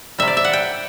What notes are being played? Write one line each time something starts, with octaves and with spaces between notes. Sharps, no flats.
C3 G3 E5
D5
E5
F#5
G5